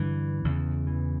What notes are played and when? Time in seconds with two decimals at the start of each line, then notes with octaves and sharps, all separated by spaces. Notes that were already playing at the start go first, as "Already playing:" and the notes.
Already playing: G2 D3 E3
0.45 E2 C#3
0.87 E3